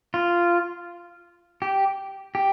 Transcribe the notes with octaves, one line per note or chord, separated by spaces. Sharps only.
F4
G4
G4